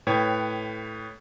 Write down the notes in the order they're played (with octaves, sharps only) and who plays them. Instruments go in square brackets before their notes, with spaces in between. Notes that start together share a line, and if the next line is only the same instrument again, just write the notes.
[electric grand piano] A2 B4 C#5 G5 G#6